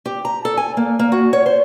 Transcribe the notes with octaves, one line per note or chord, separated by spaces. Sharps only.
G4
A#5
A4
G#5
A#3
A#3
F#4
C#5
C5